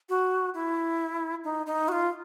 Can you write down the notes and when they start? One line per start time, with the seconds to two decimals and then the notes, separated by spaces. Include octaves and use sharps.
0.09 F#4
0.54 E4
1.44 D#4
1.66 D#4
1.88 F#4
1.92 F4